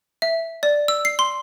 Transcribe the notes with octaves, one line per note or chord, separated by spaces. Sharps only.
E5
D5
E6
C7
C6